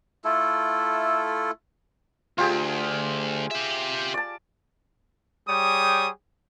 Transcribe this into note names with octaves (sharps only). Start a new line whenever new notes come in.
A3 E4 F4 A4
D2 F4 G4 G#4
G4 E5
D5 A5
G3 G#4 C#5 G5 D#6